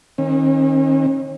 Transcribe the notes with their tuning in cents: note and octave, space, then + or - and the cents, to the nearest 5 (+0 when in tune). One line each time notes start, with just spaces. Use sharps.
D#3 +5 C#4 -45